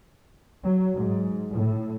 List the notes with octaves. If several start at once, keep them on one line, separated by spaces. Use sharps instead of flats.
F#3
G#2
A2